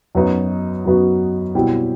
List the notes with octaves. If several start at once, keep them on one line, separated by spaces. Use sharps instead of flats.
F#2 F#3 B3 D#4 F#4
F#2 F#3 B3 D#4 F#4
B2 G3 C4 E4 G4